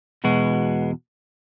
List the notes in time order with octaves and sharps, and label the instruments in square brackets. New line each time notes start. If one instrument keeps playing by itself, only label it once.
[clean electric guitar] E2 B2 G#3 B3 F#4